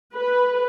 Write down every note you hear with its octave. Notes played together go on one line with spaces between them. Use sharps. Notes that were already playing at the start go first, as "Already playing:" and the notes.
B4